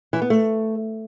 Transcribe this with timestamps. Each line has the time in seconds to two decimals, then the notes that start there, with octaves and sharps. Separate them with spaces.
0.13 E3
0.22 B3
0.30 A3